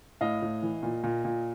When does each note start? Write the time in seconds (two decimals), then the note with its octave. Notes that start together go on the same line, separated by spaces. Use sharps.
0.21 A2 D#5 F5
0.42 A2
0.63 E3
0.83 A#2
1.04 A#2
1.25 A#2